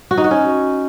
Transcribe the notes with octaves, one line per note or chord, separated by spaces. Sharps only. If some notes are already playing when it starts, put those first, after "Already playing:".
F#4
D#4
F#4
C#4